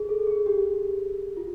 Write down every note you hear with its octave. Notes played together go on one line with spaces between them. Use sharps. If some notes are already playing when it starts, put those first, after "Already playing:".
Already playing: G#4
A4
G#4
G4
F4